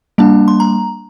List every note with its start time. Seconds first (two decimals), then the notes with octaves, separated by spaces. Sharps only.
0.18 G3 A#3 D4 A5
0.48 C6
0.60 A#5